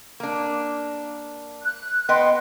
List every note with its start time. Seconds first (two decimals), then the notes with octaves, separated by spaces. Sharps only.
0.20 A#3 D4
1.64 F#6
2.09 B3 D#5 G5 C6